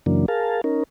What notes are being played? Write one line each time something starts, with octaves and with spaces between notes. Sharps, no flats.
F#2 C#3 E3 F#3 A#3 D4
G#4 A#4 F5 A5
C#4 D#4 A#4